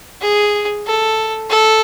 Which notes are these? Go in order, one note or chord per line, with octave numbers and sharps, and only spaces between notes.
G#4
A4
A4